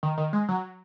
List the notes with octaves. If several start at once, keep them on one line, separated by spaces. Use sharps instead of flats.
D#3
D#3
G#3
F#3